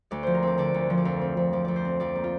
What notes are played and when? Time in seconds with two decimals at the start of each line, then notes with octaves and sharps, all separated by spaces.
0.11 D2 D5
0.23 F3 C5
0.35 A#4
0.43 C4 D5
0.58 D3 D5
0.74 D2
0.90 F3
0.98 D5
1.05 F2 F5
1.21 C4
1.37 F2
1.53 F3 D5
1.65 F2 D5
1.76 C5
1.85 C4
2.00 F2 D5
2.15 A#3
2.24 F4